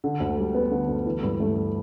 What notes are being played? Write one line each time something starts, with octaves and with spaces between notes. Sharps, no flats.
D3
D2
G3
B3
D3
D2
E3
G2
A3